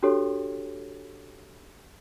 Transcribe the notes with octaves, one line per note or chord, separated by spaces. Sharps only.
D4 F#4 G4 A4 C#5